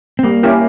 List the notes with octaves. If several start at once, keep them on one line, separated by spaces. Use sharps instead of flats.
C4
G3 A#3
C#4 E4 G4 A#4